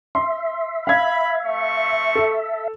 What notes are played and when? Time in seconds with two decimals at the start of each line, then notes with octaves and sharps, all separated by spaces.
0.15 E5 C6
0.87 F5 B5 G#6
1.45 A3 C4 C#6
2.15 A4